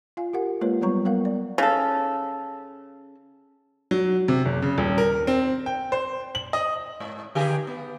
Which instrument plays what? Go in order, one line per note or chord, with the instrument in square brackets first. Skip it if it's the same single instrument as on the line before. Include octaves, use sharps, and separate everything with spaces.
[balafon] F4 F5 G#5
G4 A#4 F#5
G#3 A#3 F4 B4 C#5
F#3 G3 B3 C#5 A#5 C#6
G3 B3 A#4 F5 F#5
D5
[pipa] C#3 A4
[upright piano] F#3
C3
F#1
C#3
D#1
A#4
C4
G5
C5
F#7
D#5
[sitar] G#2
D3 G4 G#4
B3